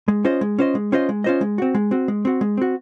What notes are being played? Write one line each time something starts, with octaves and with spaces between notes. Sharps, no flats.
G#3
C#4 F4 C5 D#5
G#3
C#4 F4 C5 D#5
G#3
C#4 F4 C5 D#5
G#3
C#4 F4 C5 D#5
G#3
C4 F#4
G#3
C4 F#4
G#3
C4 F#4
G#3
C4 F#4